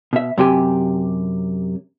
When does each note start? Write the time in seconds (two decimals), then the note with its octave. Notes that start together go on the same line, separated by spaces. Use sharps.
0.13 B2 E5
0.38 F#2 C3 G4 G#5